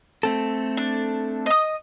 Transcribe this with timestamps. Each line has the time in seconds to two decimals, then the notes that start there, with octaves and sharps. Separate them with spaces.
0.23 A3 C4 A4
0.77 D4
1.46 D#5 D#6